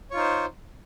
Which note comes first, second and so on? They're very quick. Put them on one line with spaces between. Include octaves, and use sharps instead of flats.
C#5 F4 D#4 C5